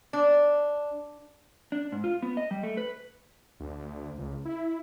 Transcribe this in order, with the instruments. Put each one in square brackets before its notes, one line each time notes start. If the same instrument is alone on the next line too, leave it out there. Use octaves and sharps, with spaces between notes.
[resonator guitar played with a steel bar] D4
[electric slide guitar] D4
G#2
F4
B3
D#5
G3
A3
B4
[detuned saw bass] D2
C#2
E4